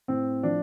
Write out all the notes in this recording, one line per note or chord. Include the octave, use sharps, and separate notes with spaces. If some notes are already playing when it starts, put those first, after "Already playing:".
A2 C4
F3 D4